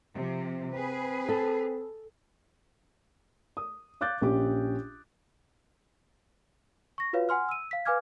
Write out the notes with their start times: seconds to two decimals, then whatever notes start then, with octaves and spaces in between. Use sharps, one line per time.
0.14 C3 F3
0.73 C4 G#4 B4
1.29 A4
3.57 D#6
4.01 F5 D6 F#6 G6 A6
4.21 A#1 C#4 G4 D6
6.98 C#6 A#6
7.13 F4 F#4 B4 C#5 F5
7.29 F#5 G#5 C6 F6
7.49 E6 D#7
7.71 F5 B6
7.85 B4 F5 G#5 D6 F6 G#6